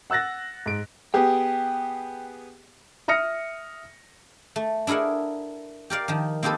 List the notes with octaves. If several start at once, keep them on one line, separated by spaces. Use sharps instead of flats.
F#5 E6 F#6 A6 A#6
G#2 D7
B3 G4 G#4 G5
E5 D#6 F6 A#6 C#7
A3
D4 E4 G#4 A#4 F#5
G4 A#4 D5 F5
D#3 F3
A#3 C4 D#4 G4 A4 B4